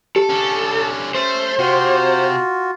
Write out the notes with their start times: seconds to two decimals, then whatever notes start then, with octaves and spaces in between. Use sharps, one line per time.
0.16 G4 A4
0.29 D3 C#4
1.15 A3 C#4 C5
1.59 C3 F4 F#4